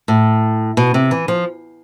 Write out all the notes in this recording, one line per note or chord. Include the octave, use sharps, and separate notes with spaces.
A2
B2
C3
E3
F3